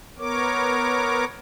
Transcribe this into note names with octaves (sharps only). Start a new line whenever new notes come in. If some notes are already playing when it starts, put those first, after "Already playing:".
B3 A#4 C#5 D6